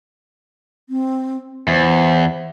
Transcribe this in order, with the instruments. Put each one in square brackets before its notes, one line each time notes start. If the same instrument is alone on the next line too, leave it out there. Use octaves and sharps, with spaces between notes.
[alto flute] C4
[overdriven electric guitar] E2 [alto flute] C5